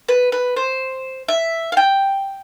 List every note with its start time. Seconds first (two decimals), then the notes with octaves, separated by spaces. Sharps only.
0.08 B4
0.32 B4
0.56 C5
1.28 E5
1.72 F5
1.77 G5